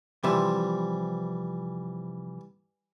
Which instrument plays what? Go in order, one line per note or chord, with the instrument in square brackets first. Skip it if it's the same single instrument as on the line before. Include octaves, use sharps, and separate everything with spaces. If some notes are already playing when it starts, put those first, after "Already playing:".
[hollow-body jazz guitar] C3 F3 E5 [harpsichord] E3 G3